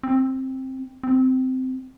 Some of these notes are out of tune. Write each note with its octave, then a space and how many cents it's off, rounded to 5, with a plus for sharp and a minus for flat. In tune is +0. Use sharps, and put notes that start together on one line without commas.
C4 +10
C4 -15